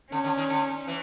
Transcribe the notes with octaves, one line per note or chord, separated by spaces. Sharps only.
D3 C#4
D3
D#3
D3
E3